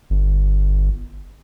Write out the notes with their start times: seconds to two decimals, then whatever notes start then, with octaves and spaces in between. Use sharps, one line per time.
0.10 G1